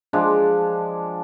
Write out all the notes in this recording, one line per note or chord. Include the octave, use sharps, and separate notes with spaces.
F3 G#3 D4